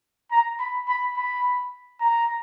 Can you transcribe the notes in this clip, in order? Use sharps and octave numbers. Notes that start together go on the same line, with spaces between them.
A#5
B5
B5
B5
A#5